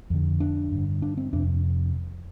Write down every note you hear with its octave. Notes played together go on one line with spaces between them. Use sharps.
F2 D3
D4
G2 D3
D4
C4
F2 C3 D4